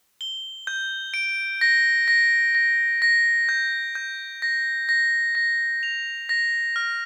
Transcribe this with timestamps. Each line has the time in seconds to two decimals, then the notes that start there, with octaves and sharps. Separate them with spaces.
0.21 G7
0.67 G6
1.14 D7
1.61 A#6
2.08 A#6
2.55 A#6
3.02 A#6
3.49 G6
3.95 G6
4.42 A#6
4.89 A#6
5.35 A#6
5.83 F7
6.29 A#6
6.76 F6